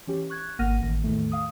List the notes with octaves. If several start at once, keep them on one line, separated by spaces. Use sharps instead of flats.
E3 C#4 G4
C#6 F#6 G#6
G#1 A#3 F#5 F6 A#6 D#7
A1 D#3
E2 A2 D#3 A3
F5 D#6